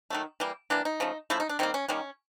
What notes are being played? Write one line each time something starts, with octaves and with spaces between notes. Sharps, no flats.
D#3 F#3 A3
E3 G3 A#3
E3 G3 A#3 D4
D#4
C#3 F3 A3
C#3 F3 A3 E4
D#4
D4
D#3 G3 A#3 C4
C#4
D#3 G3 A#3 C#4